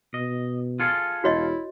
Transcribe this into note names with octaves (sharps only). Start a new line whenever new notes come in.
B2 D#5
F4 G#4 A4
E1 E4 F#4 C#5 D#5